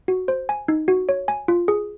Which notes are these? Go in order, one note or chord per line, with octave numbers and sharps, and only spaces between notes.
F#4
C5
G#5
D#4
F#4
C#5
G#5
F4
G#4